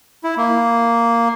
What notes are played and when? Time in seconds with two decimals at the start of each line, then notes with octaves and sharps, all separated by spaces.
0.24 E4
0.37 A#3